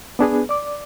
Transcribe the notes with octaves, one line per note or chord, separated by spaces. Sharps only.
B3 D4 G#4 B4
D5 D6